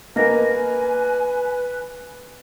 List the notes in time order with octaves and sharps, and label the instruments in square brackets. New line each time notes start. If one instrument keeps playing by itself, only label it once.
[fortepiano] A#3 A#4 [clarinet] B4 [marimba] D#5 A#6 [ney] G#5